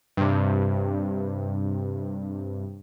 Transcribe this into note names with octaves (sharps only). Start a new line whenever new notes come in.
G2 C3